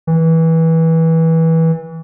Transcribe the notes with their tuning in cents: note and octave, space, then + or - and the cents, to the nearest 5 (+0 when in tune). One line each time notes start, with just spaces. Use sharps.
E3 -20